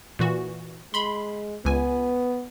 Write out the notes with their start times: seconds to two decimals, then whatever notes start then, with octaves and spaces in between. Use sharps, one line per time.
0.19 A#2 E3 F#4
0.94 G#3 B5 C6
1.65 C#2 B3 G#5